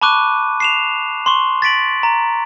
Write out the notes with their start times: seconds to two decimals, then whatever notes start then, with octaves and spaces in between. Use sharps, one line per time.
0.01 A5 B5 C#6 D6 F#6 D#7
0.60 C7 E7 F7
1.26 C6 C#6
1.62 A6 B6 D7 F#7
2.03 A#5